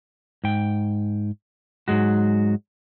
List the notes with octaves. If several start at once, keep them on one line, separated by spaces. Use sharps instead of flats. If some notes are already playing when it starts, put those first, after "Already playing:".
G#2 G5
G#2 B2 F#3 G#3 F#4